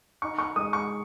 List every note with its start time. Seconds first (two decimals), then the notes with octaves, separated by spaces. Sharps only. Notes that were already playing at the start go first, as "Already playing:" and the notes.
0.22 D#4 C#6
0.38 C#6
0.56 G#3 D#6
0.73 C#6